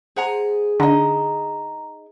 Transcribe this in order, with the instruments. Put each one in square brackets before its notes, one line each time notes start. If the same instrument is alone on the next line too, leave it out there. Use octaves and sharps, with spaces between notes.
[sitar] G#4 [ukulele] C5 F#5 A#5
[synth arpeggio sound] D3 [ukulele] D#4 D#5 [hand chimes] A#5